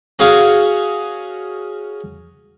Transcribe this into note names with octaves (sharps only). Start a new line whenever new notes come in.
C#4 F#4 G#4 F5 G#5